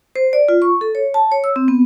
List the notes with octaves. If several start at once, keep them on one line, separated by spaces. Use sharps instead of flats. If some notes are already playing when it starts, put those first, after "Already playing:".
C5
D5
F4
C#6
A4
C#5
A5
C#5
E6
C4
B3